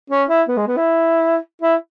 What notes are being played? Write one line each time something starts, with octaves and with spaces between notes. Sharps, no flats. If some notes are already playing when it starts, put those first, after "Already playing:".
C#4
E4
B3
G#3
B3
E4
E4